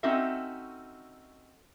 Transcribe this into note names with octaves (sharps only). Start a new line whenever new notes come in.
C4 C#4 D#4 F#4 A4 E5